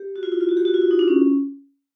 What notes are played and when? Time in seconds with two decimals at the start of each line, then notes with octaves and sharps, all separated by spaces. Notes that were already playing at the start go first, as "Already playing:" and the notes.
Already playing: G4
0.16 F#4
0.23 F4
0.32 E4
0.41 F4
0.49 F#4
0.57 G4
0.65 F#4
0.74 F4
0.82 E4
0.91 D#4
0.99 D4
1.08 C#4